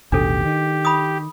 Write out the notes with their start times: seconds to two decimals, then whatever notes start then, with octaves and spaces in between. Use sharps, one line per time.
0.12 A1 D#2 B2 D4 G4 A4
0.45 D#3
0.85 B5 D#6